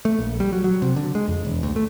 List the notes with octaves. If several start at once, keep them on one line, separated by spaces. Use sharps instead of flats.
A3
A#1
G3
F#3
F#3
C3
D3
G#3
F2
E1
D2
A3